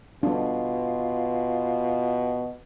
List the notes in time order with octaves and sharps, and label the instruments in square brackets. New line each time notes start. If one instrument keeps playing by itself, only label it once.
[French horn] B2 [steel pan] D4 [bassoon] F4